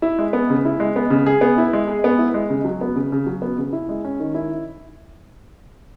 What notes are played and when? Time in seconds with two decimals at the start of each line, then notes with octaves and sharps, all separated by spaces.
0.02 E4
0.18 G#3
0.33 B3
0.50 C#3
0.65 E4
0.80 G#3
0.96 B3
1.10 C#3
1.26 G#4
1.41 B3
1.58 E4
1.73 G#3
1.88 G#4
2.04 B3
2.19 E4
2.34 G#3
2.50 C#3
2.65 F#3
2.81 B3
2.95 C#3
3.12 C#3
3.26 F#3
3.42 B3
3.58 C#3
3.73 E4
3.89 G#3
4.05 C#4
4.20 D#3
4.34 E4